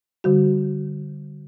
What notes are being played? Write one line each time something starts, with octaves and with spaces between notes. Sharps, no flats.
D3 G3 F#4